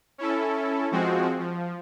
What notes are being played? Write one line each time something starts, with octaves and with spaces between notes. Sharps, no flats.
C#4 E4 A4
F3 G#3 C4 F#4
F3